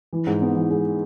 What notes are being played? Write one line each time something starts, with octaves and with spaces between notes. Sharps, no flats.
E3
G#2
B3
E3
G#3